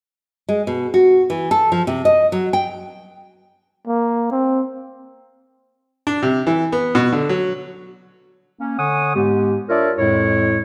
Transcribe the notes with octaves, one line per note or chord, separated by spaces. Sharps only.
G#3
B2
F#4
E3
A4
F3
C3
D#5
F#3
G5
A#3
C4
D4
C3
E3
B3
B2
D3
F#3
A#3 C#4
D3 C#5 F#5 G#5 D#6
G#2 G#3 B3 G4
D4 F4 A#4 C#5 D5 E5
F2 A2 G#3 E4 C#5